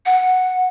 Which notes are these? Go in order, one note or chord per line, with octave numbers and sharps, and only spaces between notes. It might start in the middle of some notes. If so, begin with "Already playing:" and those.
F#5